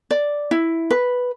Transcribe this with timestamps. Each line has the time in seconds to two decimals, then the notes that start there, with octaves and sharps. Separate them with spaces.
0.11 D5
0.51 E4
0.91 B4